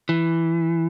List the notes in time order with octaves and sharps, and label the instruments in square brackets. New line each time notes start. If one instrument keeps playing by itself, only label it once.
[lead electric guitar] E3